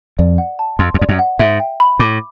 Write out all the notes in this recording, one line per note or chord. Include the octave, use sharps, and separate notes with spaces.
F2 D5
F#5
A5
F2 C6
E2
F2 D5
F#2
F#5
G#2 E5
G5
B5
A2 D6